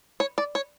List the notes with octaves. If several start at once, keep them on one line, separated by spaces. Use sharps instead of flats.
C#5
D5
C#5